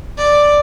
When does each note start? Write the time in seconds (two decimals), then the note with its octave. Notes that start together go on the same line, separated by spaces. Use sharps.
0.18 D5